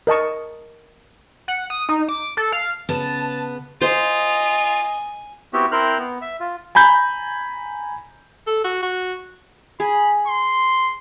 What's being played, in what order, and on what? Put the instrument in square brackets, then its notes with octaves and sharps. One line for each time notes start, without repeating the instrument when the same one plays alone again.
[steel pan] A#4 D#5 A5 C#6
[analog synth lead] F#5
D#6
D#4
D6
A4
F5
[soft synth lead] C#3 [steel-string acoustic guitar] B3 [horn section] A5
[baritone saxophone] F4 [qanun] C5 [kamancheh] D#5 [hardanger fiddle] G#5
[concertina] B3 C4 E4 F#4 G4
C4 E4 A#4 C5 F6 F#6
B3
E5
F4
[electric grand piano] G#5 A#5 B5 G6
[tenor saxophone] A4
F#4
F#4
[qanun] G#4 [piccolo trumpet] B5
[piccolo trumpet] C6